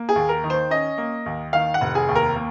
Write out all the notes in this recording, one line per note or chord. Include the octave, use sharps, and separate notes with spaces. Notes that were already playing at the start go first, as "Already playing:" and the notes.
Already playing: A#3
G#4
D#2
A#4
D#3
C5
C#4 D#5
A#3
D#2
D#3 F5
F#5
F1
G#4
D#2
A#4
A#3